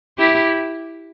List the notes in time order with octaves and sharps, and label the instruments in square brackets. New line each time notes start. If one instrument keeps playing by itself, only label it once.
[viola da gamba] E4 G4